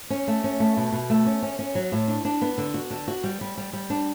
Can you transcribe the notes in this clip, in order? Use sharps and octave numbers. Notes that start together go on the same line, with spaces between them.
C#4
A3
C#4
A3
B2
B2
A3
C#4
C#4
C#4
F#3
A2
D4
D4
B3
D3
F#4
D3
F#4
G3
G3
G3
G3
D4